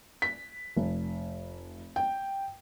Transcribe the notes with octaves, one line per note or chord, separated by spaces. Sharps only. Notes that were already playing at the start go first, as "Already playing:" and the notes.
B6
F1
G5